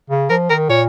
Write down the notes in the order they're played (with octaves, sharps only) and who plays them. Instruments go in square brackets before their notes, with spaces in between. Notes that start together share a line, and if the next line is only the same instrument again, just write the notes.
[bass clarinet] C#3
[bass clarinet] F3 [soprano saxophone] A#4
[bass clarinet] D#3 [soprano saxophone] A#4
[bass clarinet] A#2 [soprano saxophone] C#5